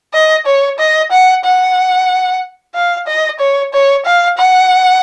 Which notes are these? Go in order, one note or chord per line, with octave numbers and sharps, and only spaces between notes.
D#5
C#5
D#5
F#5
F#5
F5
D#5
C#5
C#5
F5
F#5